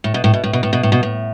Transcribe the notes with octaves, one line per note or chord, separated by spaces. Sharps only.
A2
B2
A2
B2
A2
B2
A2
B2
A2
B2
A2